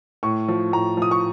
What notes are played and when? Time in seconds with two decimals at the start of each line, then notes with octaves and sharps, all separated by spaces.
0.23 A2 C#6
0.48 F3
0.72 A2 A#5
0.97 F3 D#6
1.11 C#6